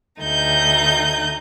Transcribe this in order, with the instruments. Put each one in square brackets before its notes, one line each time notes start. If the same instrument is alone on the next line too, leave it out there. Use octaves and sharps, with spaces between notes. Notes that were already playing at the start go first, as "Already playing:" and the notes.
[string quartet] D2 D#4 G6